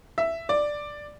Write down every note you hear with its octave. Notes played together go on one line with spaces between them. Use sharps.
E5
D5